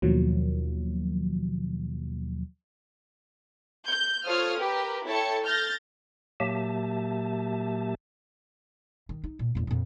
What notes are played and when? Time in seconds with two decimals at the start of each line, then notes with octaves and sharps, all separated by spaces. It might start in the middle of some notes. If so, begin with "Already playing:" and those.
0.02 D#2 B2 D#3 F3 F#3 A#3
3.89 G6
4.25 F4 A4 C5 C#5 D#6 F6
4.59 G4 A#4 B4
5.05 E4 A4 C#5 G5 A5 C#7
5.44 F6 G6 A6 A#6
6.40 A#2 F#3 A#3 G4 E5 A5
9.09 D#3
9.24 D#4
9.39 A#2
9.55 A1 E2
9.67 F2 A#2